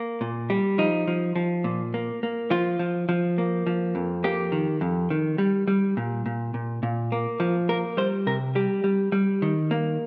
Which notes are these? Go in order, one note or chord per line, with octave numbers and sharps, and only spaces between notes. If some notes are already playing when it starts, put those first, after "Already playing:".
Already playing: A#3
A#2
G3
F3 D#4
F3
F3
A#2
A#3
A#3
F3 F4
F3
F3
A#3
F3
F2
A#3 G4
D#3
F2
D#3
G3
G3
A#2
A#2
A#2
A#2
A#3
F3
A#3 A#4
G3 C5
C3 A#4
G3 G4
G3
G3
D#3
A#3